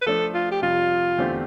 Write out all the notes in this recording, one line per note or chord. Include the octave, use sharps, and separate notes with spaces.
B4
F3 A3 D4 A4
F4
G4
F2 C3 G3 F4
E2 D3 A3 C4 G4